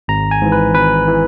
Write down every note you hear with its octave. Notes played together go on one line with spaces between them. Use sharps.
G#1 A#5
G#5
G#2 E3
B4
G#1 B4
E3